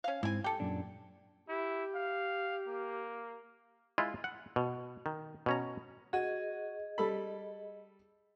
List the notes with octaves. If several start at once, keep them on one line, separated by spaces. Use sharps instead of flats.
C#4 F5
G#2 C4 E4 G#5
G4 A4 G5
F#2 A#2 D4
E4 G4
F5
A#3
G#3 E4 F4 D#5
F#5
B2
D#3
B2 C#4 A#5
F#4 G#4 D#5
G3 A4 B5